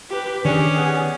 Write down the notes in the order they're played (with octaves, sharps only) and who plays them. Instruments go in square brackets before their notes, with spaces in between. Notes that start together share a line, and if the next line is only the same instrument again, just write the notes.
[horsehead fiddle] G4 B4
[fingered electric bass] D#3 [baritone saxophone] C#4 [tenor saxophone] D4 [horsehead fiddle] G4 G#4
[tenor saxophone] B3